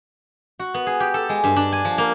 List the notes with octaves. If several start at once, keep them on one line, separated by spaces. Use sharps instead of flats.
F#4
B3
G#4
G4
A4
G#3
G2
D4
G#5
F3
A#3